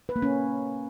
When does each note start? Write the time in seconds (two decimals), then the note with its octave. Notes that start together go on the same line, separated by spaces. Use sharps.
0.09 B4
0.16 A#3
0.22 C#4